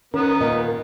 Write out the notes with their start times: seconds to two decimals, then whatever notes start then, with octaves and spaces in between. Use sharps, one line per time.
0.14 D#3 B3 C#4 A#4
0.41 A#2 D#3 A#3 D#5